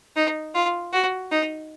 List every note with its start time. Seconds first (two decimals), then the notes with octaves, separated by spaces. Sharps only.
0.16 D#4
0.55 F4
0.93 F#4
1.31 D#4